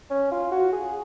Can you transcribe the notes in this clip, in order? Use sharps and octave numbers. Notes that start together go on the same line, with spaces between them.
C#4
F4
F#4
G#4